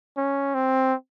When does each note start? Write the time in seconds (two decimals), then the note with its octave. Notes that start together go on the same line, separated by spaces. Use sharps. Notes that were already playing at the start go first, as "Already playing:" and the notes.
0.17 C#4
0.54 C4